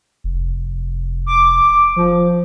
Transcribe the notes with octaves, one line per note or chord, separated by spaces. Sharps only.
F1
D6
F3